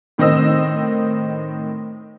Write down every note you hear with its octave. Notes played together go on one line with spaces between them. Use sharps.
A2 D#3 C4 D#5 E6